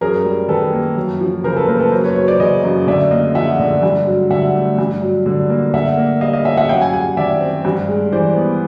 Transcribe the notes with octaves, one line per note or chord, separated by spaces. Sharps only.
F#2 G#4 A#4
G3
D#3 A4 B4
A#3
F#2
F3
C#3 A#4 C5
A4 B4
A#3 A#4 C5
A4 B4
F#2 A#4 C5
B4 C#5
F#3 B4 C#5
C5 D5
C#3 C#5 D#5
F#2
D3 D5 E5
A#3 D#5 F5
F3 E5 F#5
D3
G2
F#3
D3 E5 F#5
A3
G2
F#3
D3
A#3
D3 E5 F#5
A#3
G3 D#5 F5
D#5 F5
C#4 E5 F#5
E5 F#5
F#2 F5 G5
F#5 G#5
G3 F#5 G#5
D#3 D5 E5
C4
G2
G#3
E3 C5 D5
B3